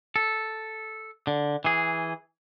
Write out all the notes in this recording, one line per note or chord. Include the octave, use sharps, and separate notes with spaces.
A4
D3
E3 G#4